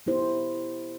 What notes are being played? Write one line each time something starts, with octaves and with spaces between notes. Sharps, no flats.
B3 E4 G4 C5